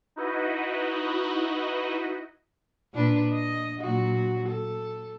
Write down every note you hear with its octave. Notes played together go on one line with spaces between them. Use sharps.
D#4 E4 F#4 B4 D#5
A#2 D4 B4
D#5
A#2 F#3 F#4
A4